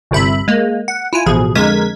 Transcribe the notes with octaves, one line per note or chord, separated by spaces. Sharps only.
G1 C2 C3 E5 B5
G#3 A#3
F#5
E4 F4 G#5
A1 B2 F3 G#4
F2 D3 G#3 A#4 G#6 B6